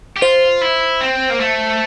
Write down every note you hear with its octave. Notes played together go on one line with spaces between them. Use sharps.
G4
F4 C5
E4
C4
A#3
A3